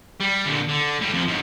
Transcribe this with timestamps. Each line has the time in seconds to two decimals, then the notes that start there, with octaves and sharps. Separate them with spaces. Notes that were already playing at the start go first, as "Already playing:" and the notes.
0.21 G3
0.46 D2 A#2
0.69 D3
1.01 A2 G3
1.14 F2 F3
1.28 G#2 F#3